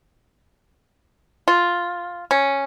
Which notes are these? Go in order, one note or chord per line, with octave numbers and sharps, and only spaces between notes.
F4
C#4